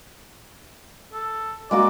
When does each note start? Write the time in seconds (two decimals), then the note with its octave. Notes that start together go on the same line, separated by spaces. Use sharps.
1.13 A4
1.71 G#3 A#3 F#4 D5